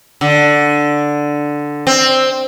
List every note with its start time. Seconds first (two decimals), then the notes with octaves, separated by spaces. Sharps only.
0.21 D3
1.87 C4